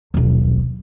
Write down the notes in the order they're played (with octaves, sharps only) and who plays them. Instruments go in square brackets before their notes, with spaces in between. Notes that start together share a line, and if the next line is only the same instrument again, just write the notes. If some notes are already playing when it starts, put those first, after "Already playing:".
[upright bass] D#1 B1